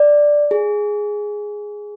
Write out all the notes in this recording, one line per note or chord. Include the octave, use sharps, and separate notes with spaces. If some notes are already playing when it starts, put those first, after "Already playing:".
Already playing: D5
G#4